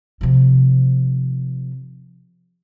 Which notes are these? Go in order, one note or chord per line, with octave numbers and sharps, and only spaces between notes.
C3 F3